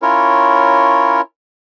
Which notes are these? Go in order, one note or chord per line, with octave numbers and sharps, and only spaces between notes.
C#4 E4 F4 A#4 C#5